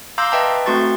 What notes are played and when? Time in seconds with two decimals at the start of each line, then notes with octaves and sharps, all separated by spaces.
0.18 F5 A#5 C6 D6 E6 G6
0.32 B4 D#5 E5 G5 A5 A#5
0.66 A3 C4 F#4 C6 C#6 A6